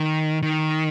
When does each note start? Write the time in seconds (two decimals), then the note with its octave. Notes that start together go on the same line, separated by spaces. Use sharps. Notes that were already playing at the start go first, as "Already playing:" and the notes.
Already playing: D#3
0.43 D#3